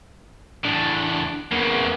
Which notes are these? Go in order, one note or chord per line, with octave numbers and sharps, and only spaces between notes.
E2 A2 D4
E2 C#3 A#3 B3